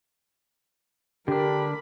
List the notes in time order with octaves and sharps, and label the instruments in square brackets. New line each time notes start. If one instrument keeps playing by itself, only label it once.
[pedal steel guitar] D3 D4 [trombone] G4 [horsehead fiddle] A#4 B5